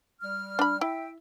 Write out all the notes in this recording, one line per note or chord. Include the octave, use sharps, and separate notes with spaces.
G3 F6
D4 B5
E4 E5 G5